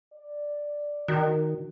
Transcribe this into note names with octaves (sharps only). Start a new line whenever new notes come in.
D5
D#3 F#4